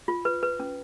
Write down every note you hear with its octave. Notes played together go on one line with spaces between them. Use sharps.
F4
B4
B4
C#4